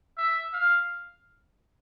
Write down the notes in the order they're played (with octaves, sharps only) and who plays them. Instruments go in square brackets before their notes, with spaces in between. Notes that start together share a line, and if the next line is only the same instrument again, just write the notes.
[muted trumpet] E5
F5